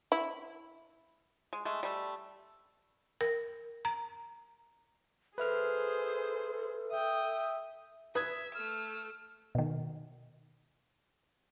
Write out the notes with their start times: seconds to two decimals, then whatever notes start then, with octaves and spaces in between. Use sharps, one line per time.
0.12 E4
1.53 G#3
1.65 G#3 A3
1.83 G3 A3
3.21 A#4
3.85 A#5
5.38 G#4 A4 B4 C5 E5 F6
6.92 E5 G5 D#6
8.15 B4 E5 D#6 G#6
8.55 A3 E6 F6
9.55 B2 D#3